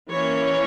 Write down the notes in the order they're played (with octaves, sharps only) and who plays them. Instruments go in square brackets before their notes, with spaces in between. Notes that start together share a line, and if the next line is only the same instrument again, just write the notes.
[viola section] E3 A#3 C#4 C#5